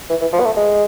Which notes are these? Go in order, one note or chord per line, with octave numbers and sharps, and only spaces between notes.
E3
E3
F3
B3
A3
G#3